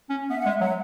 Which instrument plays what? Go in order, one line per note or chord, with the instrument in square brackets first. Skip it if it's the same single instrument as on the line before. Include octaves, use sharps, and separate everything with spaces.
[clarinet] C#4
[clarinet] B3 [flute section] E5
[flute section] F#5
[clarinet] G#3
[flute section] E5
[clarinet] F#3 [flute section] F#5